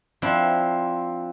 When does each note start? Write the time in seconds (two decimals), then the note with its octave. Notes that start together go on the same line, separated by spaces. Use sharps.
0.22 F3 C4 D4 E4